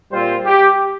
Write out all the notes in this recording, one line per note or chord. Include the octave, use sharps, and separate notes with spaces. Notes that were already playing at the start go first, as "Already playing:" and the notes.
A#2 G3 C4 F4 C5
G4